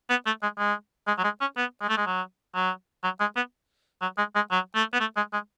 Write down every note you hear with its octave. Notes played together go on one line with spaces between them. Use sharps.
B3
A3
G#3
G#3
G#3
F#3
G#3
C#4
B3
G#3
A3
G#3
F#3
F#3
F#3
G#3
B3
F#3
G#3
G#3
F#3
A3
B3
A3
G#3
G#3